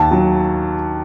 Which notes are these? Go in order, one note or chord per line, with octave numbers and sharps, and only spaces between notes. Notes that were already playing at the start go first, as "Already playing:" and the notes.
Already playing: D#2 A5
F#3